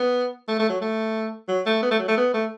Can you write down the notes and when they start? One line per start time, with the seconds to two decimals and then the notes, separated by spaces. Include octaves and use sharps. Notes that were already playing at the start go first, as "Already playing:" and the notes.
Already playing: B3
0.48 A3
0.59 A3
0.69 F#3
0.81 A3
1.48 F#3
1.66 A3
1.82 B3
1.91 A3
1.99 F#3
2.08 A3
2.17 B3
2.33 A3